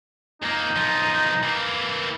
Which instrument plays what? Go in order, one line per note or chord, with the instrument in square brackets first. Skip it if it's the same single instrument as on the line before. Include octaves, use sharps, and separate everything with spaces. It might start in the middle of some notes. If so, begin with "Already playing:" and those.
[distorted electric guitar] F2 A#3 [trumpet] D#4
[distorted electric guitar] B1 F3
E3 A#3